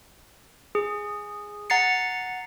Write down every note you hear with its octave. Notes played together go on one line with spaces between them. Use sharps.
G#4
F#5 A#5 A6 C7 C#7